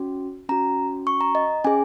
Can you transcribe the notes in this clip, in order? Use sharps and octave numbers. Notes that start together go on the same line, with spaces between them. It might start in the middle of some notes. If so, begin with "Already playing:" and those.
Already playing: C#4 F#4
C#4 F#4 A#5
C#6
A#5
D#5
C#4 G#4 G#5